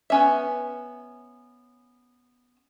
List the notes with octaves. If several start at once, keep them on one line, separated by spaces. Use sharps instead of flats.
B3 C#4 E5